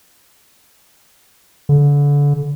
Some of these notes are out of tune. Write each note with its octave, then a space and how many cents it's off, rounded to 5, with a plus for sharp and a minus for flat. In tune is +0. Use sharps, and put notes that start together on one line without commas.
D3 -30